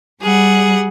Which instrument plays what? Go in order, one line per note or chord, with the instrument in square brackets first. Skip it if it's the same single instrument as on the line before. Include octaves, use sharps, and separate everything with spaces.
[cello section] G3 [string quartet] G#4 F#5